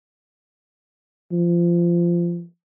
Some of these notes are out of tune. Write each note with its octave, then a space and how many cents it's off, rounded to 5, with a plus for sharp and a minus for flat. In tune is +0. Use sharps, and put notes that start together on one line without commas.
F3 -20